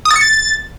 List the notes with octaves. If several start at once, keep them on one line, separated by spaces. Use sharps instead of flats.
D#6
A6
C#7
A6